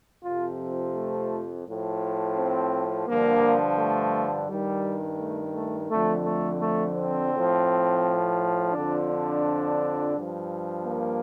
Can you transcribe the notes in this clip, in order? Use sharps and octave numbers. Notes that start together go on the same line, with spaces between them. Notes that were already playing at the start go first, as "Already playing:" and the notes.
F2 C3 F3 F4
A3
A2 F3
C4
G2 D3 F3 A#3
A3
G2 D#3 G3
A3
A3
F2 D3 F3 A3
A3
A3
C4
A2 F3
F2 D3 F3 D4
D4
G2 F3
A#3